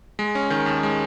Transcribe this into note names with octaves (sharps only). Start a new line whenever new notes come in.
G#3
C#4
D#3
D#2
G#3